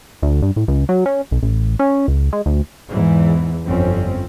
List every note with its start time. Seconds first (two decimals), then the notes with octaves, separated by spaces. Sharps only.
0.23 D2
0.42 G2
0.56 A2
0.68 C#2
0.89 F#3
1.06 C#4
1.31 B1
1.43 A1
1.79 C#4
2.08 C#2
2.33 G#3
2.46 D2
2.92 E2 G#2 E3
3.65 G1 F2 C4 C#4